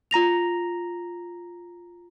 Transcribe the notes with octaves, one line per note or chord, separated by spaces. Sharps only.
F4 A#5 A#6 F7